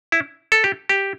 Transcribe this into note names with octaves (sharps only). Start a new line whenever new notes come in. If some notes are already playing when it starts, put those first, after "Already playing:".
E4
A4
G4
G4